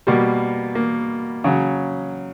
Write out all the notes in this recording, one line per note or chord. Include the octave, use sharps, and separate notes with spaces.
B2 G3 A#3
A#3
C#3 F#3